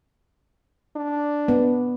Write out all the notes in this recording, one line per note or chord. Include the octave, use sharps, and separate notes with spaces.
D4
B3